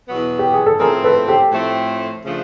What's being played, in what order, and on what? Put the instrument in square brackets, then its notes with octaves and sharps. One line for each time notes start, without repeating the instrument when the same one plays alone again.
[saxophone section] E2 B2 F#3 B3
[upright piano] G4
G#4
A4
[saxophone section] A2 F3 A3 C4 [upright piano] G#4 A#4
[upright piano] A4 B4
G4 A4
[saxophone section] A2 F3 A3 C4
C#3 F3 A3 D4